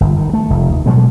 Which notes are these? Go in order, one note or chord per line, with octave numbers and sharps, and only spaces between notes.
G1
D#3
A3
F1
D#2
B2 F#3 G#3 A3